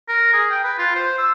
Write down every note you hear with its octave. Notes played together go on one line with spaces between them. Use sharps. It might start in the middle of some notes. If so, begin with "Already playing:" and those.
A#4
G#4
G5
B4
F4
C5
E6